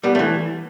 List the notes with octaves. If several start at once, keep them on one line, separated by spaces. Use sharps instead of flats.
G3 B3
E3 A3